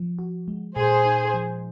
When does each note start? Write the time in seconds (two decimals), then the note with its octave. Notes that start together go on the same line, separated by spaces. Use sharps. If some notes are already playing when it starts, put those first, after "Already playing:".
Already playing: F3
0.19 F#4
0.48 G#3
0.76 A#2 G#4 C5
1.05 D#4
1.34 F3